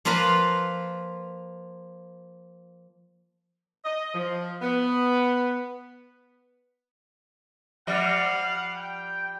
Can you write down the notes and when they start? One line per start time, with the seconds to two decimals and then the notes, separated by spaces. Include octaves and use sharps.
0.05 F3 A#3 F4 B4 F5 A#5
3.85 D#5
4.14 F3
4.62 B3
7.87 F3 G3 D5 F5 F#5
8.76 G5